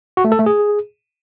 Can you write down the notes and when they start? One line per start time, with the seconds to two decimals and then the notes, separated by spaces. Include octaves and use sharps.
0.17 F#4
0.24 A3
0.32 A4
0.39 A3
0.46 G#4